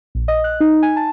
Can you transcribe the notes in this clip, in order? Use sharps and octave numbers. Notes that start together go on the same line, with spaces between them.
A#1
D#5
F#6
D#4
G#5
A5